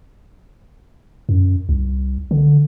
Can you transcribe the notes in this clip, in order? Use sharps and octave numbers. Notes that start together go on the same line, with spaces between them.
F#2
C2
D3